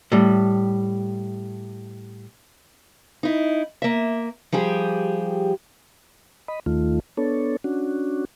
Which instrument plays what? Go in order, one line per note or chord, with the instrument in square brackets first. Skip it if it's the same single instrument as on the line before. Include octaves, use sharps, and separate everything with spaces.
[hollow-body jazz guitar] A2 G3
[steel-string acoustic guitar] D#4 E4
A#3 E5
F3 G3 G4 G#4
[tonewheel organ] D#5 B5
D#2 D#3 A3 F4
B3 D4 A4 C#5
C#4 D4 F#4